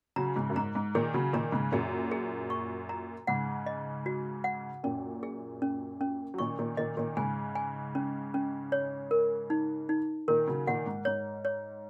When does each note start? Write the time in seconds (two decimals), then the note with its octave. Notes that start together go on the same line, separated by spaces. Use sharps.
0.16 C#3 F#3 A#5
0.36 G#2 C#3
0.50 F#2
0.56 G#2 A#5
0.75 G#2
0.95 A#2 D#3 G#4
1.14 C#3 F#3
1.33 A#2 D#3 A#5
1.52 G#2 C#3
1.72 F#2 A#2 G#4
2.11 G#4
2.50 C#6
2.89 A#5
3.27 G#2 C#3 F#5
3.66 D#5
4.06 F#4
4.44 F#5
4.83 F#2 A#2 C#4
5.23 G#4
5.62 C#4
6.01 C#4
6.34 F#3
6.38 A#2 D#3 C#6
6.59 A#2 D#3
6.77 A#2 D#3 D#5
6.97 A#2 D#3
7.17 G#2 C#3 G#5
7.55 G#5
7.95 C#4
8.34 C#4
8.72 C#5
9.11 A#4
9.50 D#4
9.89 D#4
10.28 A#2 D#3 A#4
10.48 C#3 F#3
10.67 A#2 D#3 F#5
10.86 G#2
11.05 G#2 C#5
11.45 C#5